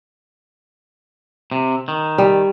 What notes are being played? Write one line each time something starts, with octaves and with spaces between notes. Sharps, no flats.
C3
D#3
G3